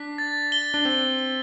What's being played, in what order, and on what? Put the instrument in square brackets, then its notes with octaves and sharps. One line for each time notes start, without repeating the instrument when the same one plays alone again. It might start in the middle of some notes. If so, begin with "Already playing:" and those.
Already playing: [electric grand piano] D4 [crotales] B6
[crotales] A6
G7
[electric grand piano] D4
[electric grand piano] C4 [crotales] G7
[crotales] G7